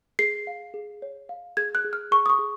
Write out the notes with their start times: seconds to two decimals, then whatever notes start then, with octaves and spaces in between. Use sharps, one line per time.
0.19 G#4 C7
0.47 F5
0.74 G#4
1.02 C#5
1.29 F5
1.57 G#4 G#6
1.75 F#6
1.85 G#4
1.93 F6
2.11 G#4 C#6
2.26 D#6
2.30 C#6
2.39 G#4